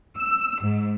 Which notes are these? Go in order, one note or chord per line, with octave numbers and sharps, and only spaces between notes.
E6
G#2